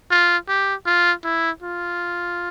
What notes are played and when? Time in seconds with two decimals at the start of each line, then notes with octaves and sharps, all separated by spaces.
0.11 F4
0.48 G4
0.86 F4
1.24 E4
1.62 F4